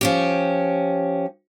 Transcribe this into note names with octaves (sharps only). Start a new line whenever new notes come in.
F3 C#4 G4